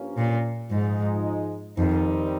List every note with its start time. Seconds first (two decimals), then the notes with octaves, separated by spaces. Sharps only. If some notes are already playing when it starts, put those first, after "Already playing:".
Already playing: G2 F3 A#3 C#4
0.17 A#2
0.70 G#2 F3 G#3 D#4
1.78 F2 D#3 G3 C4 D#4